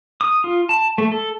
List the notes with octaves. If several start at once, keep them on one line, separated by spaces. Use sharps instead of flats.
D#6
F4
A5
A3
A4